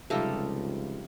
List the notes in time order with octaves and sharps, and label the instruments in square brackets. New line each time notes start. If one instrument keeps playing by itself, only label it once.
[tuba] C#2 [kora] C3 F3 G3 [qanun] D#4 A4 F5